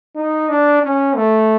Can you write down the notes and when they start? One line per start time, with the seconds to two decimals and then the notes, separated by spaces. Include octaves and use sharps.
0.16 D#4
0.49 D4
0.82 C#4
1.15 A3